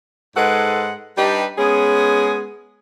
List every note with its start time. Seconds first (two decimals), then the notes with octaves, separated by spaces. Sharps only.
0.36 G#2 G#3 A4 B4 F#5
1.16 G3 D4 D#4 G4 B4
1.58 G#3 B3 C#4 G#4